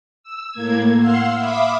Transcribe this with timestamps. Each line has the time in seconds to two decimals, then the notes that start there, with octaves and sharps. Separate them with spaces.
0.23 E6
0.53 A2 A#3 G#6
0.99 F5 F#5 C6 E6
1.38 E5 F5 B5 D6 D#6